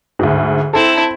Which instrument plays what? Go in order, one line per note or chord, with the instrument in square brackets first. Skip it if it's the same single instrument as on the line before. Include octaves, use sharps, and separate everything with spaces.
[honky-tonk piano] D2 G#2
[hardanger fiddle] C4 E4 [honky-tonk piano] A4